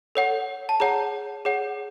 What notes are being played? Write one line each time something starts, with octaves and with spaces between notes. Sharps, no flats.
A4 C#5 F#5
A5
G#4 C#5 F#5 A#5
G#4 C#5 F#5